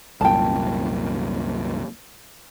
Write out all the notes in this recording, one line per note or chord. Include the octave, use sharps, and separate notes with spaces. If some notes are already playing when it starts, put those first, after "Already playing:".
C2 F#2 A#2 G5 A5